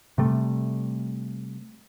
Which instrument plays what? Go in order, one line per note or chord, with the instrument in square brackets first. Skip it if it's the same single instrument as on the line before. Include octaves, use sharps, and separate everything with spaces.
[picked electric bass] C3 G3 A3